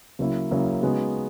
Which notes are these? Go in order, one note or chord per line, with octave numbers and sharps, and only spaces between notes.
C#3 F#3 A#3 E4
C#3 F#3 A#3 E4
C#3 G#3 B3 D#4 F#4